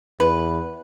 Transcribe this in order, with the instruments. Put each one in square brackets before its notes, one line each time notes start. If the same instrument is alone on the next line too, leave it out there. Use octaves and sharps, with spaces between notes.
[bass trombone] E2 [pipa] B4